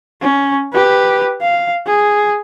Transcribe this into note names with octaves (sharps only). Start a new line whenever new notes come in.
C#4
G4 B4
F5
G#4